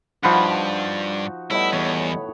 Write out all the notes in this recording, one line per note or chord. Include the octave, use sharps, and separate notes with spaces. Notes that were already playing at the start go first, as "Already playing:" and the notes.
G2 F3 D#4 F#4 F#5 B5
A2 G3 B3 E4 D#5 B5
E2 C#5